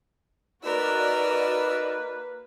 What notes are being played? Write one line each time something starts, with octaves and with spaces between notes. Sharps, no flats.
A#3 D#4 F#4 A#4 B4 D5 E6